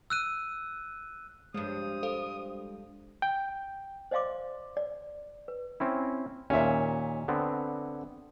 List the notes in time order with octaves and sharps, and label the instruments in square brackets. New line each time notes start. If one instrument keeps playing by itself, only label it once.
[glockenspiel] E6 F#6 D#7
[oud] G2 F3 [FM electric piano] G#3 [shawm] D#6
[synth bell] A4 C5 F5
[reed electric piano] G5
[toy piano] C5 D5 D#5 F5 C6 D6
D5
B4
[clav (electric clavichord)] C4 C#4 E4
[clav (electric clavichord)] D#2 A#2 [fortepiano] C#4 E5
[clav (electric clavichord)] D3 B3 C4